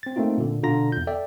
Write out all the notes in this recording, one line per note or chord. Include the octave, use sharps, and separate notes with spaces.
C4 A6
A3 A#3 C4 D#4 F4
A#2 D3
B2 D3 D4 F4 A#5 A#6
E2 G6
A4 D5 E5 G5